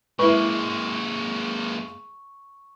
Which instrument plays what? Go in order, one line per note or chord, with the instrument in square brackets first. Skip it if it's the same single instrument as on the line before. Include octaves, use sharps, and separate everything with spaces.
[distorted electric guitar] G#3 A#3 [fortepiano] E4 B4 [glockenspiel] C#6